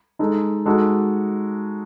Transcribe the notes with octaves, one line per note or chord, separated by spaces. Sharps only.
G#3 D#4 A4
G#3 D#4 F#4 A4